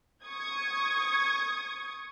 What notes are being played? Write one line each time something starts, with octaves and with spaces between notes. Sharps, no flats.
C#6 D#6 G#6